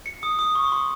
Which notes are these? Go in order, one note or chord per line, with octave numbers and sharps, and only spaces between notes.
C#7
D#6
D#6
C#6
C6